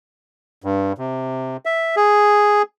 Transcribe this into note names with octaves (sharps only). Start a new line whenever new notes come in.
G2
C3
E5
G#4